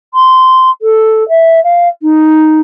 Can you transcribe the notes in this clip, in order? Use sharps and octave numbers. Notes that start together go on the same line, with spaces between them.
C6
A4
E5
F5
D#4